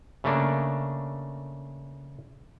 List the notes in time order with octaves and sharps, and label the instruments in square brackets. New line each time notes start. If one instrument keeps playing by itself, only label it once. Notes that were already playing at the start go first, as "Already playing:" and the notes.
[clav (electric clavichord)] C#3 A3 A#3 D4